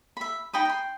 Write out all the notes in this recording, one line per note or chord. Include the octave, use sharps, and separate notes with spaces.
E5 B5
D#4 G5 B5 D#6
G5 C6